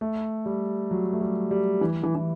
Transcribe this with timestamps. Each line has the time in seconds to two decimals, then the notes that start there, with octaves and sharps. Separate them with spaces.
0.01 A3
0.46 G3
0.91 F#3
1.13 A3
1.21 G3
1.51 G3
1.81 E3
2.03 E3
2.15 E3